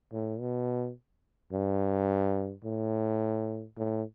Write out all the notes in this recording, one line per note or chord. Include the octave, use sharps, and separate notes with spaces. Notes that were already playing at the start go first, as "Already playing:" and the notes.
A2
B2
G2
A2
A2